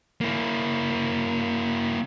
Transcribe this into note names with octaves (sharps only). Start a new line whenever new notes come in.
A#3 E4